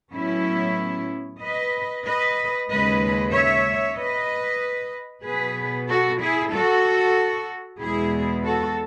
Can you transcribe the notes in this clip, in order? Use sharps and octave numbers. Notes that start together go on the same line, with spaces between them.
A2 F#3 B3 C#4 E4
B4 D#5
B4 D#5
D#2 C#3 G#3 B4 D#5
C#5 E5
B4 D#5
B2 F#3 B3 G#4 B4
F#4 A4
E4 G#4
F#4 A4
E2 B2 G#3 B3 E4 G#4
F#4 A4